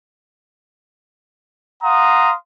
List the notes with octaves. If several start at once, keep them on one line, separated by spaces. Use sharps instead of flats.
F5 F#5 A#5 C6 D#6